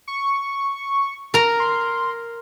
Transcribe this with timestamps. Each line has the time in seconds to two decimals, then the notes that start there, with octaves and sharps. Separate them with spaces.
0.08 C#6
1.34 A#4 A#5
1.60 C6